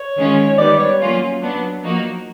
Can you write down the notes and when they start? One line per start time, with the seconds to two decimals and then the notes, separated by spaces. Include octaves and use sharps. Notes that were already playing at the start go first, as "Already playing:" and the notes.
Already playing: C#5
0.17 D#3 G#3 C#4 F4
0.58 D#3 G3 B3 D5
0.80 C#5
1.01 F#3 A#3 C#4 F4
1.42 F#3 B3 D4
1.83 F3 A#3 D#4 F#4